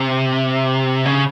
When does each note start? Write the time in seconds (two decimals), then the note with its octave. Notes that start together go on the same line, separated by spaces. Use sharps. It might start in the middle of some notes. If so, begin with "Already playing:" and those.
Already playing: C3
1.06 C#3